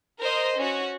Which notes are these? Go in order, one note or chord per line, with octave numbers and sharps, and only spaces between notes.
A#4 C5 D#5
C#4 F#4